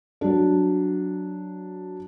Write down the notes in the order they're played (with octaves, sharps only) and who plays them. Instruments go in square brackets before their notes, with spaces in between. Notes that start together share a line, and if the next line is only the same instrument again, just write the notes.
[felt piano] F#3 D4